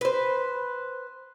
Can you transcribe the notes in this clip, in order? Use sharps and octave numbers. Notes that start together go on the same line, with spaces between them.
B4 C5